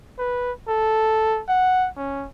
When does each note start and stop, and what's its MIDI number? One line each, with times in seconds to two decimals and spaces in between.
0.19 0.52 71
0.68 1.42 69
1.49 1.88 78
1.97 2.26 61